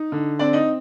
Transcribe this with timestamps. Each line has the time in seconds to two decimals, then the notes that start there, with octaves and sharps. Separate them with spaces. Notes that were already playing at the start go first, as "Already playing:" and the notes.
Already playing: D#4
0.12 D3
0.39 C4 D4 D5
0.53 D#4 D#5